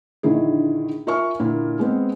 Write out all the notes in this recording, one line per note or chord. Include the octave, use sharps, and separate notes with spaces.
A#1 D3 D#3 E4 G#4
F4 A#4 E5 G#5 C#6 F6
A#2 D3 A#3 E4
G#3 B3 C4